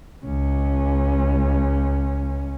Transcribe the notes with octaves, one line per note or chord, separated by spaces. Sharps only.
C#2 C#4